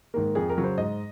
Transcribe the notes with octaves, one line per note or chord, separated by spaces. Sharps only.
G#2 D#3 A#3 A#4
F2 G#4
A#4
C#3 F#3
C5
G#2 D#5